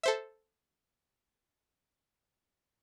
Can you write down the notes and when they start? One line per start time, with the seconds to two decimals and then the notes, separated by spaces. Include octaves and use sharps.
0.03 A4 C5 E5